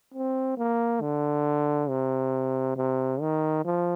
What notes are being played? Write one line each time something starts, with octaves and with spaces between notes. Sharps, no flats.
C4
A#3
D3
C3
C3
D#3
F3